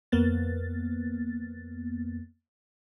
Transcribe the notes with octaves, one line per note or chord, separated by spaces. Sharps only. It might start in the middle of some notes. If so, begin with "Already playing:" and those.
F2 A#3 B3 A6